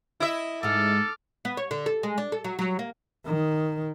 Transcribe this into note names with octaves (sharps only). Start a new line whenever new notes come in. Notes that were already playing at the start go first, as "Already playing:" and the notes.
E4 D#5 E5
G#2 G#3 A4 D6 F6
B3
C#5
D3
A4
G#3
D4
A4
F#3
F#3
A#3
D#3